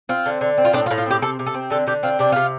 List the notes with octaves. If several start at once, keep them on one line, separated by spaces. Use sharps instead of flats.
C4 F4
D3
D3
C4
F4
A2 D4
F4
A2
F4
C4 G4
C3 A4
C3
A4
C4
D3 A4
D3 G4
C4 F4
C3 D4
C3 F4